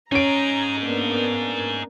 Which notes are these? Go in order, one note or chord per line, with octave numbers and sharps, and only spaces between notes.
C#4 D#4 G#4 A#5 D7
A#3 B3 D4